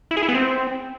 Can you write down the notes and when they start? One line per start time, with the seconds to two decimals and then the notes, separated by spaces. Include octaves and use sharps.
0.11 E4
0.17 G#4
0.23 E4
0.29 B3
0.34 C4